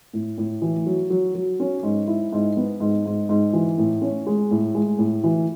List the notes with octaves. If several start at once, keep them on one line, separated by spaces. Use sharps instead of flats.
A2
A2
E3
F#3
F#3
F#3
C#4
G#2
E4
G#2
B3
G#2
G#2
G#2
E3
A2
C#4
G#3
A2
G#3
A2
E3